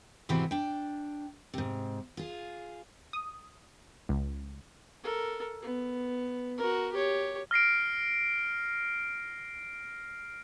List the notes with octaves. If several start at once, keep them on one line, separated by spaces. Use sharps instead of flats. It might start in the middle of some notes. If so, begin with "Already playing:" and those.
G#2 C3 E3 B3 C4 F#4
D4 G5
G#2 C3
F4 G#4
D#6
C#2
A4 A#4
B3
F#4 A#4
G4 C#5
F6 A#6 C7 D7